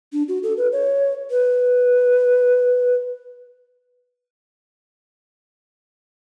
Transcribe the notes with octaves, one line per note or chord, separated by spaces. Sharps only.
D4
F#4
A4
B4
C#5
B4